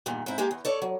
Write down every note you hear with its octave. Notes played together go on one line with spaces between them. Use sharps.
E2 G2 A#2 D#3
G#2 C4 E4
G#3 A#3 G4 G#4
E2
A4 C#5 D5
F#3